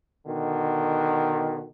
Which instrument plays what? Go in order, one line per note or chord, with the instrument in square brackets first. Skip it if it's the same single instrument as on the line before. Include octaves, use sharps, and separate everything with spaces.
[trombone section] B2 D3 D#3